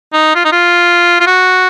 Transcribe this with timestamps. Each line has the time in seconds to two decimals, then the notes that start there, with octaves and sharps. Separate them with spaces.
0.13 D#4
0.35 F4
0.45 D#4
0.52 F4
1.21 F4
1.27 F#4